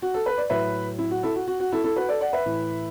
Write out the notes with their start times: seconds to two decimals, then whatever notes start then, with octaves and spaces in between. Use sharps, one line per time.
0.02 F#4
0.14 A4
0.26 B4
0.38 D5
0.50 A2 F#3 B4 E5
0.98 E4
1.11 F#4
1.23 E4 A4
1.36 F#4
1.47 F#4
1.60 F#4
1.72 E4 A4
1.84 E4 A4
1.96 F#4 B4
2.09 A4 D5
2.21 D5 F#5
2.33 B4 E5
2.46 A2 E3